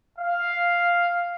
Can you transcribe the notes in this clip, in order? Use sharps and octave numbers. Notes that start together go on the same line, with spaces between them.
F5